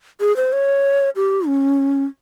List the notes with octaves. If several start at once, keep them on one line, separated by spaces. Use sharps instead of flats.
G#4
C5
C#5
G4
C#4